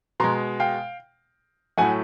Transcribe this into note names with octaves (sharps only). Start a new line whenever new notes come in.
B2 G#3 A#5 C6
F5 G5
A2 F#3 A3 F#5 G#5